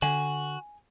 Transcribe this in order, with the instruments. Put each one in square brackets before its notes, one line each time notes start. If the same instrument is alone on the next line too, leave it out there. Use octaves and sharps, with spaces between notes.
[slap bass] D3 [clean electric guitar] F#4 [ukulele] G#5